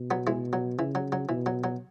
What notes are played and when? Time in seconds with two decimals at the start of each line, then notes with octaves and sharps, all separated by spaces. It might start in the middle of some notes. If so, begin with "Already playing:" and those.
Already playing: B2
0.11 F#3 B3
0.27 E3 G#3
0.53 F#3
0.78 C#3 E3
0.95 F#3
1.12 F#3
1.29 B2 E3
1.46 F#3
1.64 F#3